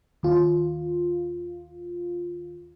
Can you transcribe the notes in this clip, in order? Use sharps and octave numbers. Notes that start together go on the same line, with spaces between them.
D#2 F4